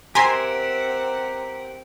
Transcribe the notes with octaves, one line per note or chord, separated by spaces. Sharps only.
C4 G4 A#4 E5 F#5 G#5 A#5 C6